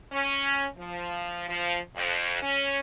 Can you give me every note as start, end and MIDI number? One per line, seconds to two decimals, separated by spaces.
0.12 0.65 61
0.78 1.47 53
1.48 1.78 53
1.96 2.41 41
2.42 2.79 61